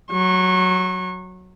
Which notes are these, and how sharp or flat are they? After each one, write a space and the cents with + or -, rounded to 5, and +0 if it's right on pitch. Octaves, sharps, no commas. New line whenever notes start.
F#3 +0 C#6 -30